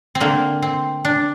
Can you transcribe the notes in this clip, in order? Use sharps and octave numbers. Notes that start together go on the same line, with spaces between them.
C4
D3 A3 A#3
C4
D4